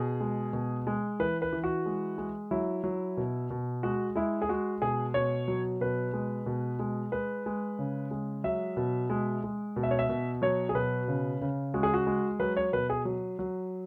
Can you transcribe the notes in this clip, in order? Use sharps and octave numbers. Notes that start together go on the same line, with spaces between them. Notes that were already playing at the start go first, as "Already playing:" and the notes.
Already playing: B2 G#4
G#3
B2
G#3
E3 B4
B4
E3
F#4
G#3
G#3
F#3 E4
F#3
B2
B2
G#3 F#4
G#3 E4
G#4
G#3 F#4
B2 G#4
B2 C#5
F#3
B2 B4
G#3
B2
G#3
G#3 B4
G#3
C#3
G#3
F#3 E5
B2
G#3
G#3
B2
E5
C#5
E5
B2
F#3 C#5
G#4
B2 B4
C#3
C#3
G#3 F#4
G#4
F#4
G#3
F#3 B4
C#5
B2 B4
G#4
F#3
F#3